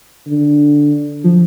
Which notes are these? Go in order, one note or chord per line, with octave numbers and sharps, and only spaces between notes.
D3
F3